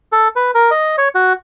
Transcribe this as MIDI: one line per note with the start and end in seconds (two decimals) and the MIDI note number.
0.12 0.28 69
0.36 0.51 71
0.55 0.70 70
0.71 0.96 75
0.98 1.09 73
1.15 1.33 66